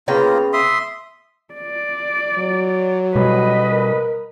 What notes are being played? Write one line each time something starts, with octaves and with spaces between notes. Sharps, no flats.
C#3 A#3 B3 F4 G5 A#5
E5 C6 D#6
D5
F#3
B2 G3 B4 D#5
A#4